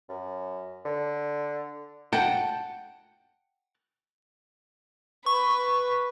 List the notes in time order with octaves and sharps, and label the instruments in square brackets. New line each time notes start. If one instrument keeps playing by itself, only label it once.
[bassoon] F#2
D3
[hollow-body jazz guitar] F#5 G5 A5
[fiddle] B4 [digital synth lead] C#6